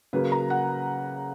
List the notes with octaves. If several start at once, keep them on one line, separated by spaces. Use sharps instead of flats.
C#3 F#3 A#3 B4
A#5
F#5